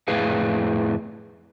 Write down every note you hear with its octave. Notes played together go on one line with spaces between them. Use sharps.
F2 A2 E4 G#4 B4 F5